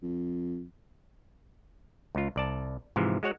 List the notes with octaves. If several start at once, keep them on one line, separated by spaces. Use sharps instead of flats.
F2
C#2 F4
C2 D5 A5
G#2 C3 E3 F3
G#3 F#4 C#5 F#5